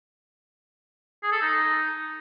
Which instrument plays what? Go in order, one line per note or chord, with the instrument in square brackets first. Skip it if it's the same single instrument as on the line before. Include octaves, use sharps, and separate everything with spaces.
[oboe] G#4
A4
D#4